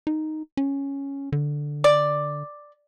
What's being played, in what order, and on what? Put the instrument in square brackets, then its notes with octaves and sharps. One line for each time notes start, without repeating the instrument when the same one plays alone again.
[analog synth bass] D#4
C#4
D3
[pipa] D5